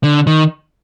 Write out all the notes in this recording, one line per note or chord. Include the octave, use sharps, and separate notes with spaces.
D3
D#3